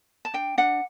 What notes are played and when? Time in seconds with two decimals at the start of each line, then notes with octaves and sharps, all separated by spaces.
0.25 A5
0.34 D4 G5
0.58 D4 F#5